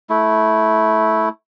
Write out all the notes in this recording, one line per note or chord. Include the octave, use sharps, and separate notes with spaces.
A3 E4